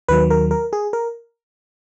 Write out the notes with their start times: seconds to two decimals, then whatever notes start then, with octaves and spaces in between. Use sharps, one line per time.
0.08 D#2 D#3 F#3 B4
0.30 A#4
0.51 A#4
0.73 G#4
0.93 A#4